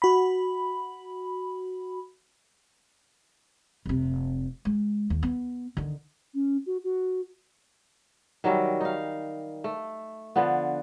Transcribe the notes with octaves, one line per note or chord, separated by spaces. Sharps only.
F#4 B5
F1 C3
G#3
D#2
B3
D3 D#3
C#4
F#4
F#4
D#3 F#3 G3 E5
D#4 F5
A3
D3 F3 B3